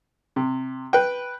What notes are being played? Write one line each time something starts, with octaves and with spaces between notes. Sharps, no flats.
C3
B4 G5